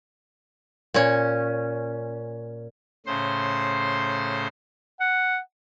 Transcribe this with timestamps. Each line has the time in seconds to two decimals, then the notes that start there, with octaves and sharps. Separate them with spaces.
0.94 A#2 C#4
3.07 A2 C#3 C5 C6
5.00 F#5